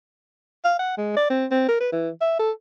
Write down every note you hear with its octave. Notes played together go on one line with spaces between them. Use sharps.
F5
F#5
G#3
D5
C4
C4
A#4
B4
E3
E5
A4